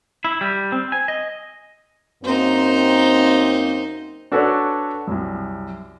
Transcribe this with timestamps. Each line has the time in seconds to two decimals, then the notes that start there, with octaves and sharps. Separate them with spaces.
0.25 E4
0.41 G3
0.72 C4
0.92 G#5
1.08 D#5
2.24 F#2 A#3 C4 D#4 C5
4.32 D4 F#4 A4 B4 C#5 D5
5.07 C2 F#2